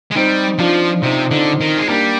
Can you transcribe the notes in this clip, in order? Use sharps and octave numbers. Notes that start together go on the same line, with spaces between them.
G#3
G3 C4 D#4
F3 D4 F4
C3 C4 D#4
D3 C4 D#4
D#3
G#3
G3 A#3 D4